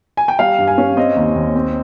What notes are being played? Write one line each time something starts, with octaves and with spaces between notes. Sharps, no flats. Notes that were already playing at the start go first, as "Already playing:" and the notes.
G#5
G5
G3 F5
G2
G#5
C#4
C4 D#5
D#2
D#2
C4